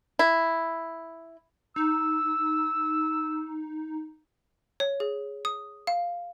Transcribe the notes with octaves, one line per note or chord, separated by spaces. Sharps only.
E4
D#4 E6
C#5
G#4
D#6
F5